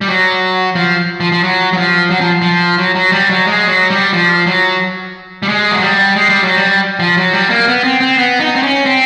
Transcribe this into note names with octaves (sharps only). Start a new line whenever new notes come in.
G3
F#3
F3
F3
F3
F#3
F#3
F3
F#3
F3
F3
F#3
F#3
G3
F#3
G#3
F#3
G3
F3
F#3
G3
G#3
F#3
G3
G#3
G3
F#3
G3
F3
F#3
G3
A#3
B3
C4
C4
B3
D#4
C4
C#4
C4